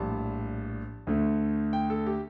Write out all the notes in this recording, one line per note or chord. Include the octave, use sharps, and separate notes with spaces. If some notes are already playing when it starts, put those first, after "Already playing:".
Already playing: A#1 A2 G3 A5
D2 D3 A3
G5
A4
G4